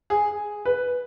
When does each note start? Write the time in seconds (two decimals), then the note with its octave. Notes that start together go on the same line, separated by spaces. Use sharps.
0.10 G#4
0.65 B4